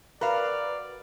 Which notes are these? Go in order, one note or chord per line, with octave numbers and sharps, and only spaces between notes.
F#4 A#4 B4 D5 F5